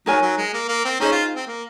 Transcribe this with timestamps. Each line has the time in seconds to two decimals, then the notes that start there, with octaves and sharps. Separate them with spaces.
0.06 F#3 D#4 A#4 C#5 G#5
0.22 F#3
0.38 G#3
0.53 A#3
0.68 A#3
0.85 C4
1.00 C#4 D#4 G#4 C5 D#5
1.12 F4
1.35 C4
1.47 A#3